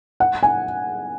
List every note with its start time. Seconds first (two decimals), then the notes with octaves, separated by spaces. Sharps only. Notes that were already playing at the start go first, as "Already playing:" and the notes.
0.20 F#5
0.43 G#5